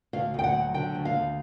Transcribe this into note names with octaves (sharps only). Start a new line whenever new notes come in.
D2 F5
D2 G5
F#5
F#3
D3 G5
D2
F5
D2